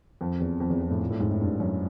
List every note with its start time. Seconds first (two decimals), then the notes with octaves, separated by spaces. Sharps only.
0.21 F2
0.40 E2
0.60 F2
0.70 E2
0.81 F2
0.90 A2
1.00 A#2
1.10 A2
1.20 G#2
1.31 A2
1.41 G2
1.60 F#2